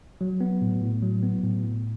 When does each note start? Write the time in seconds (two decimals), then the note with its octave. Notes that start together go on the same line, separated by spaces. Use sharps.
0.21 F#3
0.41 B3
0.61 A2
0.81 A2
1.02 F#3
1.23 B3
1.44 A2
1.63 A2